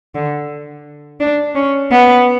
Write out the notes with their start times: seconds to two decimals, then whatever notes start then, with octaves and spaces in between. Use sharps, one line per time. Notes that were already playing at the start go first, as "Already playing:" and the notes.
0.15 D3
1.20 D4
1.55 C#4
1.91 B3